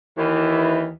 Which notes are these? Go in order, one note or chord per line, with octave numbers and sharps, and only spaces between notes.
D#2 D#3 E3